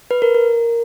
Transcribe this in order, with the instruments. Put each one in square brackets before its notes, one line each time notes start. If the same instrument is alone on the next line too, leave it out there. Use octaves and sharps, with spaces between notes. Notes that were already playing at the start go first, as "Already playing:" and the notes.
[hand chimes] B4
A#4
A#4